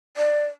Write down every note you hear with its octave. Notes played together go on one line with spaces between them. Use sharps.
D5